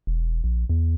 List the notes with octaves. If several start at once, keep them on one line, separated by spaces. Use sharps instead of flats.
E1
A#1
E2